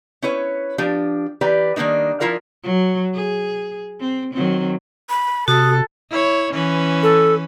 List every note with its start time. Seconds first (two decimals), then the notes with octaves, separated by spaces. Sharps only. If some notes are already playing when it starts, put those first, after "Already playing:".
0.22 C#4 E4 B4 C#5
0.78 F3 D4 G4
1.41 E3 G4 B4 D5 A#5
1.76 D#3 G3 A#3 D4 D#4
2.20 F3 E4 F4 A#4 D5
2.63 F#3
3.14 G#4
4.00 C4
4.33 D#3 F#3 C4
5.09 B5
5.48 C3 F#4 A4 D#6
6.10 E4 C#5
6.52 E3 C#4 B4
7.03 A4